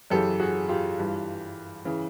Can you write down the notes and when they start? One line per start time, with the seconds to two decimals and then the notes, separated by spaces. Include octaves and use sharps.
0.10 F#2 C#3 E3 G4 A4
0.40 F#4 G#4
0.69 F4 G4
0.99 G2 E3
1.85 C#3 E3